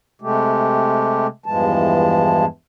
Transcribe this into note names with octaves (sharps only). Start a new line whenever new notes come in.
C3 G#3 A3 G4
E2 G2 E3 F3 G#3 A5